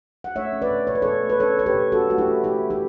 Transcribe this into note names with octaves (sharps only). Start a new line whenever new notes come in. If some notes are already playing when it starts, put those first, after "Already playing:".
F#5
A3 C#5 E5
C#4
B4 D5
B2
B2 C#5
B4
B2 A4 C#5
A3
B4
C#4 A4 C#5
C#4 C#5
G4 B4
B2
C#4 F#4 A4
A3 F#4
E4 G4
C#4
B2 E4 G4
G3
E4 G4